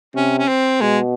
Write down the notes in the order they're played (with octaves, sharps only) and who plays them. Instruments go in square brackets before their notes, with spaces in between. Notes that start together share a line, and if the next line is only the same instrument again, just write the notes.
[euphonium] C3 [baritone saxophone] C#4
[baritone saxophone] C#4
C4
[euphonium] B2 [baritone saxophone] G#3